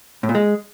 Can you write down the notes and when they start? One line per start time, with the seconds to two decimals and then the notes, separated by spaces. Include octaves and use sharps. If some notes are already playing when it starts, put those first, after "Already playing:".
0.23 A2
0.29 A#2
0.35 G#3